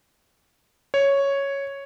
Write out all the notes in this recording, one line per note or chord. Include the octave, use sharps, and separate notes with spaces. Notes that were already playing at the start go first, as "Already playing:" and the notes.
C#5